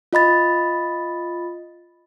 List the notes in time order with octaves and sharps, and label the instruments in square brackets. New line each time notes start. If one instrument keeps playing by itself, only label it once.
[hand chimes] F4 D#5 B5 A6